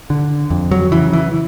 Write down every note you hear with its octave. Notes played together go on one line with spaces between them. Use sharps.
D3
F2
F#3
C#3 E3
E3